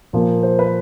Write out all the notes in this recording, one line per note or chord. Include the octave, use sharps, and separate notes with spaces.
A#2 F3 A#3
C5
B4